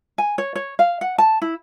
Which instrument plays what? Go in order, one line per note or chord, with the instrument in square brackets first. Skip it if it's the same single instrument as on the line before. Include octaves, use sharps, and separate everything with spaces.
[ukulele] G#5
C#5
C#5
F5
F#5
A5
E4